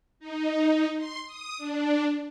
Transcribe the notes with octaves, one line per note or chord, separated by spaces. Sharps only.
D#4
C6
D#6
D4